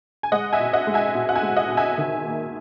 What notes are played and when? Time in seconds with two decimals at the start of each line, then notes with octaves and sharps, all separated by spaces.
0.23 G#5
0.32 G#3 D#5 F#5
0.52 E5 G#5
0.60 B2
0.73 D#5 F#5
0.87 G#3
0.94 E5 G#5
1.15 B2
1.29 F#5
1.35 E5 G#5
1.42 G#3
1.56 D#5 F#5
1.70 B2
1.77 E5 G#5
1.98 D#3
2.26 A#3